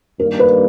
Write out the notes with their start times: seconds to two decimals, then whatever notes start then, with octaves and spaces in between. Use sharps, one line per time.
0.20 G2 D#3 G3 A#3 D4 A#4
0.39 B4